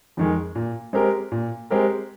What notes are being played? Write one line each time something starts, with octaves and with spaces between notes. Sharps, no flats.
F2 D#3 G#3
A#2
G#3 C4 G4 A#4
A#2
G#3 C4 G4 A#4